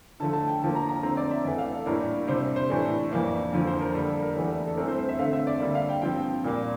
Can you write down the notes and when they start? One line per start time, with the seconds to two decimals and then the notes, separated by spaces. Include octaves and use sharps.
0.20 D3 F3 A3 A5
0.33 A5
0.48 G5
0.62 D3 F3 A#3 A5
0.75 A#5
0.89 A#5
1.03 D3 A3 C4 A#5
1.17 D5
1.31 E5
1.45 E2 E3 A3 D5
1.58 F5
1.72 A4
1.86 A2 G3 A#3 D4 A#4
2.28 C3 G3 D4 C5
2.56 C5
2.70 A2 E3 A3 D4
3.12 F2 E3 A#3 D4
3.53 F2 D3 F3
3.67 C5
3.81 A#4
3.94 D3 G3 A#3 A4
4.08 A4
4.22 A#4
4.36 E2 E3 A3 D4
4.67 A4
4.77 G2 E3 A3 C4 A#4
4.88 C5
4.99 C5
5.09 E5
5.19 D3 A3 C4 F5
5.33 E5
5.47 D5
5.60 D3 G3 A#3 E5
5.75 F5
5.89 G5
6.02 G2 F3 C4 G5
6.44 A#2 G3 A#3